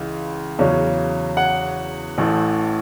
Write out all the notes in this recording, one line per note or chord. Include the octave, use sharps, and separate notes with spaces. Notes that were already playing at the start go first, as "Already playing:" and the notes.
Already playing: C#2 C#3 E3
E2 C#3 F#3 C#4
F#5
A1 A2 E3 A3